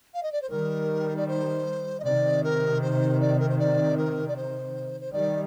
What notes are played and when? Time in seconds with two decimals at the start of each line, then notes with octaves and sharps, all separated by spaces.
0.14 F5
0.23 D#5
0.32 D5
0.42 C5
0.49 D#3 G3 A#4
1.17 D5
1.27 C5
2.00 D#5
2.04 C3 D#3 D5
2.43 A#4
2.81 C5
3.20 D5
3.39 A#4
3.49 C5
3.59 D5
3.97 A#4
4.28 D5
4.36 C5
5.01 C5
5.12 D#3 G3 D5